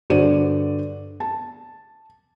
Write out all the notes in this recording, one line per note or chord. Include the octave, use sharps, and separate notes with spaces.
G2 D3 F#4 C5 D5 D#7
A5